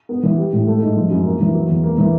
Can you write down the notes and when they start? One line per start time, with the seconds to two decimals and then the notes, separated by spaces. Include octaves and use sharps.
0.09 B3
0.23 E3
0.38 G3
0.53 A2
0.67 A3
0.81 G#2
0.97 F3
1.11 F#2
1.25 A#3
1.40 E3
1.55 F#3
1.69 E2
1.84 A#3
1.98 E3